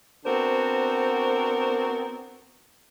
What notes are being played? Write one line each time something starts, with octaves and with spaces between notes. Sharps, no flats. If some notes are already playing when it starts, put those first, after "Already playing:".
B3 C4 D4 F#4 A#4 C5